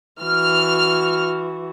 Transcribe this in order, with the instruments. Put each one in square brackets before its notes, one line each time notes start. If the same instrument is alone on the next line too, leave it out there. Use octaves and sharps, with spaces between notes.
[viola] E3 F#4 [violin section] F6